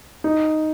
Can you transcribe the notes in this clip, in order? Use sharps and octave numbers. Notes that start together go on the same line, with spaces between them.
D#4